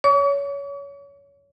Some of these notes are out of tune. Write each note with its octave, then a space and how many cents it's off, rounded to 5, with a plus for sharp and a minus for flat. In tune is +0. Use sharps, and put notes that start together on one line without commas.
C#5 +25 C#6 +45